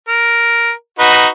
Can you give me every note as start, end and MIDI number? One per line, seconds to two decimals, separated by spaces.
0.08 0.71 70
0.99 1.27 63
0.99 1.27 66
0.99 1.27 71